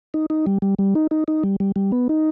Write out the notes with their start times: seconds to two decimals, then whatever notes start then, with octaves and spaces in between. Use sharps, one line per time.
0.14 D#4
0.30 D#4
0.47 G3
0.62 G3
0.79 G3
0.95 D#4
1.11 D#4
1.28 D#4
1.43 G3
1.60 G3
1.76 G3
1.92 B3
2.09 D#4